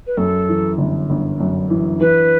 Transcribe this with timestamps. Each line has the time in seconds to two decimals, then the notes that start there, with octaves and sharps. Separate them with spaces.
0.07 B4
0.17 F#2 A4
0.49 E3
0.78 G1
1.10 G1
1.40 F#2
1.70 E3
2.00 E3 B4